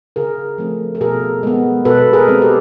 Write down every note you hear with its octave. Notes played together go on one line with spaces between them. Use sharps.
C#3 G#4 A#4
F3 A3 C4
A4
B2 G#4 A#4
G#3 B3
B2 A4 B4
G#4 A#4
G#3 C4
G4 A4